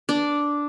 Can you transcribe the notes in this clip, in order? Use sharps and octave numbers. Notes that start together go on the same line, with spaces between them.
D4